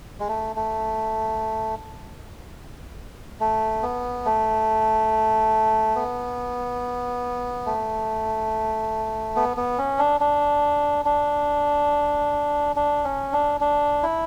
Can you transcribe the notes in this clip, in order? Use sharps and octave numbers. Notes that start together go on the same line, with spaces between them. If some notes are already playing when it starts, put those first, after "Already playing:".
G#3
A3
A3
A3
B3
A3
B3
A3
B3
B3
C#4
D4
D4
D4
D4
C#4
D4
D4
E4